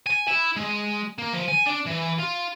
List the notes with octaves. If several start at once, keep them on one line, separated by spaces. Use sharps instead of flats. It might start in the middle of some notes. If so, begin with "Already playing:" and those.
G#5
E4
G#3
A#3
F3
G#5
D4
E3
F4